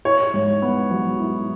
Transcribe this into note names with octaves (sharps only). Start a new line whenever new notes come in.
E4 C#5
G#2
B3
F#3
E4